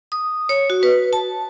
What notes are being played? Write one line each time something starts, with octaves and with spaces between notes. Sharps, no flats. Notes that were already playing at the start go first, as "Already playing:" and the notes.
D#6
C#5
F#4
B4
A5